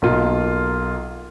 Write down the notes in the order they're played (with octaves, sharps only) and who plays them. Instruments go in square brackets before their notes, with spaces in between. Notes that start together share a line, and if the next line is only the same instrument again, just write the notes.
[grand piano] B1 A#3 F4